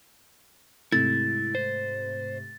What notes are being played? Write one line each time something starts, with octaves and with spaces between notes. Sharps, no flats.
G#2 C3 A3 E4 A6
C5